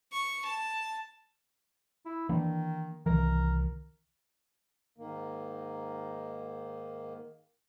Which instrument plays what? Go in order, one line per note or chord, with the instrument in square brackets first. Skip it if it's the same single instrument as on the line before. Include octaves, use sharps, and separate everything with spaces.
[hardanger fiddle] C#6
A5
[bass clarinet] E4
[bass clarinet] D#3 [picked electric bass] E3 A#3 D4
[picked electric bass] C2 D#3 E3 [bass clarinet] A#4
[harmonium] G#2 D#3 A#3